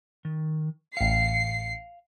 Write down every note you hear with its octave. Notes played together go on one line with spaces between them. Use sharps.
D#3
A1 F5 C7 C#7